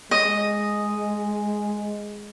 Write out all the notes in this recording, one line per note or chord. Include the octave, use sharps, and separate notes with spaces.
G#3 D#5